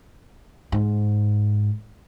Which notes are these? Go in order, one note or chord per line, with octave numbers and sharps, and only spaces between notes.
G#2